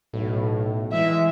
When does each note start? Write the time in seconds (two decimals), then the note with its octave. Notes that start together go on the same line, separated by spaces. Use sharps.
0.13 B1 A2
0.93 E3 G#3 E5